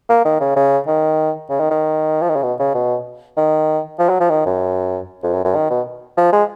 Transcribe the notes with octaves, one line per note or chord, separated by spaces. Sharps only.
A#3
D#3
C#3
C#3
D#3
C#3
D#3
D#3
F3
D#3
C#3
B2
C#3
B2
D#3
F3
F#3
F3
D#3
F#2
F2
F#2
F#2
D#3
B2
F3
G#3